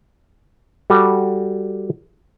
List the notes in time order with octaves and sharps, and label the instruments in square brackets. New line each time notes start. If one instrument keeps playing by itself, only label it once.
[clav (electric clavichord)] G3 F#4 A4